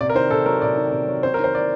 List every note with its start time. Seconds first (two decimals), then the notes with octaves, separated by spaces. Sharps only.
0.01 C3 D5
0.09 A#4
0.15 D#3 C5
0.30 C3 A4
0.46 F#3 A#4
0.62 C3 D5
0.77 D#3
0.92 C3
1.08 F#3
1.23 C4 C5
1.34 D#3 A#4
1.44 C5
1.55 D5